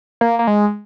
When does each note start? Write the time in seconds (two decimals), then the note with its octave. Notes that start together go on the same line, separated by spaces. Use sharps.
0.21 A#3
0.39 A#3
0.47 G#3